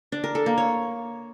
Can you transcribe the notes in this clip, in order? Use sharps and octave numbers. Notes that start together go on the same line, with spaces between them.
D4
A#4
A4
A#3
C#5